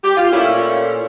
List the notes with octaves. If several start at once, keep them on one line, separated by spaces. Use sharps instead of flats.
G4
F4
A#2 A3 C#4 E4